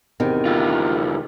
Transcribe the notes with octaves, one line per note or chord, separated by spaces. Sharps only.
E2 C3 D#3
D2 F4